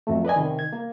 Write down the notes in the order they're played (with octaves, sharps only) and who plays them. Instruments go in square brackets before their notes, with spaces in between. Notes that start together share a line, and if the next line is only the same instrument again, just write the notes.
[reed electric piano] F2 F#3 A3
B4 D5 D#5 G#5
C3 D#3
G#6
A#3